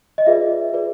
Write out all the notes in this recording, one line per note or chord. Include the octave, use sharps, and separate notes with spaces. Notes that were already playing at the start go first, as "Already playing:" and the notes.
D#5
F4 G#4 B4 D5 E5
F4 G#4 B4 D5